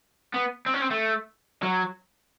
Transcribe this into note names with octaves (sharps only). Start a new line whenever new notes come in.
B3
C4
C#4
C4
A3
F#3